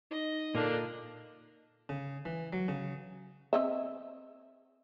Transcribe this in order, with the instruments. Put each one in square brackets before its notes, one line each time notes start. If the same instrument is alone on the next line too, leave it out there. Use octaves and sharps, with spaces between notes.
[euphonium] D#4 [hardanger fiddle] D#5
[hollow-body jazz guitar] A#2 [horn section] D3 A#3 D4
[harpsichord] C#3
E3
F#3
C#3
[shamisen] C4 D#5 E5